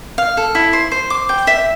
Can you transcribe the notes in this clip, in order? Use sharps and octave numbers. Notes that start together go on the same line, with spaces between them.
F5
A4
E4
C5
C5
D6
G5
E5